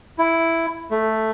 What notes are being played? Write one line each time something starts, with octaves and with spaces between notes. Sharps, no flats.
E4
A3